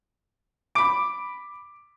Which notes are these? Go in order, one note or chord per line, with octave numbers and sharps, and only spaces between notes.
B5 D6 D7